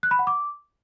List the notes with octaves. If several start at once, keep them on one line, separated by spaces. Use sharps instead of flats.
F#6
B5
F#5
D6